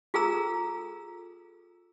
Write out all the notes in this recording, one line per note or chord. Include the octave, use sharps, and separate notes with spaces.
F4 G#4 A4 A#5 E6